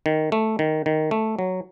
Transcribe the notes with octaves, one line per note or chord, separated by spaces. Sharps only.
D#3
A3
D#3
D#3
A3
F#3